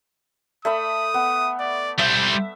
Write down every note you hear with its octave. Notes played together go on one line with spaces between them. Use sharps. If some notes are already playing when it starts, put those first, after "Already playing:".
A3 E5 B5 D#6
B3
D5
G3 C5 E5 G6